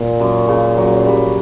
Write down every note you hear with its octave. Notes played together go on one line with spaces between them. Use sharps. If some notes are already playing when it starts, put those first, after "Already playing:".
Already playing: A#2
F#2
C#3
F#3
G3